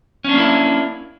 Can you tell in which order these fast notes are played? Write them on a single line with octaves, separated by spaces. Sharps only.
C#4 D4 A#3 E4